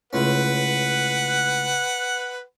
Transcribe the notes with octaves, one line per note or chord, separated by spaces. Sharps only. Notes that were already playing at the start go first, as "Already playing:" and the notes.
C#2 A2 C#4 B4 F#5